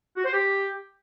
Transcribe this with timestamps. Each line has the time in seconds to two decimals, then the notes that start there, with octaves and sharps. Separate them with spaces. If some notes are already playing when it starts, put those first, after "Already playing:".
0.16 F#4
0.24 C5
0.33 G4